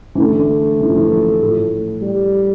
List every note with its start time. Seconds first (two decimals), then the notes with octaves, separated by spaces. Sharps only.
0.15 E3
0.20 D3 A3
0.81 E3
0.88 F3
0.97 E3
1.42 A2
2.02 G3